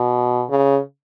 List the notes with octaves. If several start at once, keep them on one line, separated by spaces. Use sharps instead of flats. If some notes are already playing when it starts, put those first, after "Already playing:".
Already playing: B2
C#3